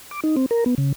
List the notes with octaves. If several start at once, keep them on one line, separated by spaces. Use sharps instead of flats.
D6
D#4
C4
A#4
B3
C#3